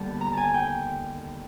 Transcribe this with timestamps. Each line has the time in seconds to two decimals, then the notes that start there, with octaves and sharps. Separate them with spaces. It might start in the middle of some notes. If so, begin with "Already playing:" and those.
Already playing: D#2 D3 G3 B3 A5
0.21 A#5
0.33 G#5 A5
0.54 G5